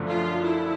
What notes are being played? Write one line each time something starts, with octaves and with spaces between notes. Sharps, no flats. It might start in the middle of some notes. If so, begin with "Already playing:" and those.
Already playing: F#2 D3 F3 A3
F4
E4